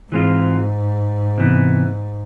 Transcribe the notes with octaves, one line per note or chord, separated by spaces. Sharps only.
G#2 E3 G#3 C4 F4
C3 E3 B3